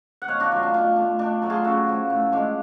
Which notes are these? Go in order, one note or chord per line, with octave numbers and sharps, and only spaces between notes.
F#5
B2 C#5 F5
D4 F#4
F#3 A3 F4
D4
B2 F4
A3 D4
B2 D4
F#3 A3
F4 G#4
C#3 F#4 A4
F3 A3
A2
F3 G#3 D4